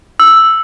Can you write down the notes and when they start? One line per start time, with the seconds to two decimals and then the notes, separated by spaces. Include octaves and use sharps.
0.20 E6